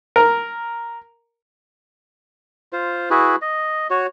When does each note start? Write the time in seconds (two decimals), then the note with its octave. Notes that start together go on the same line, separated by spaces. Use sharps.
0.16 A#4
2.73 F4 C5
3.10 E4 F#4 G#4 B4
3.42 D#5
3.90 F#4 C#5